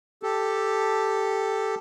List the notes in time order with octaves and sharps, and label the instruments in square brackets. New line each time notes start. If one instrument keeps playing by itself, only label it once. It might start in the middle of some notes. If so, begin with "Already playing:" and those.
[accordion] G4 A4